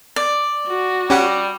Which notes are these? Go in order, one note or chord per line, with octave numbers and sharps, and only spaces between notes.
D5
F#4
G3 C#4 G4 F#5